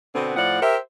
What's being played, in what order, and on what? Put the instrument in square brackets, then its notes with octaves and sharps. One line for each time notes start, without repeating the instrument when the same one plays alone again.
[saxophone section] B2 D3 B3 C4
A2 F3 D5 F#5
G4 A#4 C5 E5